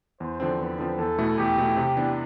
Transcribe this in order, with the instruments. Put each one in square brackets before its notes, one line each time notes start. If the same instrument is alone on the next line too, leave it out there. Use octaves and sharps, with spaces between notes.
[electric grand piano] E2 [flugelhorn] C5
[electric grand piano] D3 F3 C4
[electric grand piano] E2 [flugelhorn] B4
[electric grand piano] D3 F3 C4
[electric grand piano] E2 [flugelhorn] A4
[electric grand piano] B2 A3 E4
[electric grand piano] E2 [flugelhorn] G4
[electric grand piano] B2 A3 E4
C3
E3 B3 D4